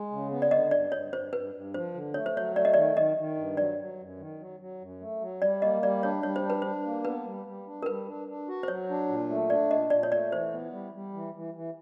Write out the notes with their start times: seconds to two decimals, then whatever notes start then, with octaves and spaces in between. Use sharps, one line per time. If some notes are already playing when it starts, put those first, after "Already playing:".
Already playing: G#3
0.11 C#3
0.31 B3
0.42 D5
0.51 D3 D#5
0.71 G2 D5
0.92 G2 C#5
1.13 G2 C5
1.33 G2 B4
1.54 G2
1.74 F3 C5
1.94 D3
2.14 A3 C#5
2.26 C5
2.36 F#3 C#5
2.55 A3 D5
2.65 D#5
2.74 D#3 D5
2.96 D#3 D#5
3.17 D#3
3.37 G2
3.57 F#3 D5
3.79 F#3
3.99 F#2
4.19 D#3
4.39 F#3
4.60 F#3
4.80 F#2
5.00 A3
5.21 F#3
5.41 G3 D5
5.62 A#3 D#5
5.82 G3 D5
6.03 D4 C#5
6.23 G3 C#5
6.36 C5
6.44 D4
6.50 B4
6.62 D4 C5
6.85 A#3
7.05 B3 B4
7.25 G3
7.46 G3
7.67 D4
7.82 A#4
7.86 G3 B4
8.07 D4
8.28 D4
8.48 F#4
8.63 C5
8.68 F#3 C#5
8.89 D4
9.09 A#2
9.30 A3
9.50 D4 D5
9.71 A#2 D#5
9.90 A#2 D5
10.03 C#5
10.11 A3 D5
10.32 E3 C5
10.52 B3
10.72 G3
10.94 G3
11.13 E3
11.34 E3
11.54 E3